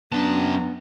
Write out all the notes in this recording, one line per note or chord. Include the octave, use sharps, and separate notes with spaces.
F#2 B3 D4 A5 A#5